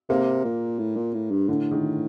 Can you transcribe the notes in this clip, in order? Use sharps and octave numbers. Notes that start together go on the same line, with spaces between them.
C3 A#3
A#2
A2
A#2
A2
G2
A2 D3
D#3